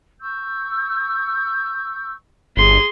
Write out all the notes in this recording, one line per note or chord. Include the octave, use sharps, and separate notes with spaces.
C#6 E6 G6
G1 G#4 C6